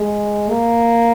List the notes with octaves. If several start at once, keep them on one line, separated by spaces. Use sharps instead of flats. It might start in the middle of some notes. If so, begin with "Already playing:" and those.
Already playing: G#3
A#3